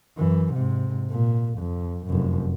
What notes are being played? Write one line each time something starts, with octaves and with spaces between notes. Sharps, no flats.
F#2 E3
G#2 C3
A#2
F2
F1 F#2